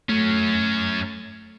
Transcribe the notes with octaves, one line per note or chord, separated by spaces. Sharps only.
F#3 A3 C#4